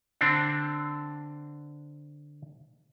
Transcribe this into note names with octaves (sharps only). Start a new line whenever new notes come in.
D3 C4 D4